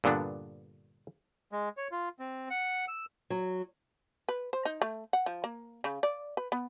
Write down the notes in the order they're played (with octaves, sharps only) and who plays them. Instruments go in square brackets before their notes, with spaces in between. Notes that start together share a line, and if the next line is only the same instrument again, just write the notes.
[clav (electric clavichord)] G2 A#2 D3 B3 D4
[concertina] G#3
C#5
F4
C4
F#5
E6
[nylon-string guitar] F#3
[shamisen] B4
C5
D#4
A3
F#5
F3
A#3
C#3
D5
B4
B3